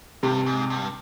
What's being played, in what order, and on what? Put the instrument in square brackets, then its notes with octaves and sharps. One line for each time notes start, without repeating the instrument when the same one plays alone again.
[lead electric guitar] G2 [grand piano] C3
[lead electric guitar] G#2
G2